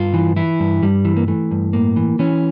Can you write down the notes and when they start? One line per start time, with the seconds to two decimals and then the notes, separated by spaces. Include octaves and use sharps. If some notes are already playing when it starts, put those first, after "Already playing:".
Already playing: G2 F4
0.14 E3
0.36 E3 E4
0.60 G2
0.83 G2 G3
1.05 E3
1.17 A#3
1.28 E3 A3
1.51 G2
1.73 A2 A#3
1.96 E3
2.19 E3 C#4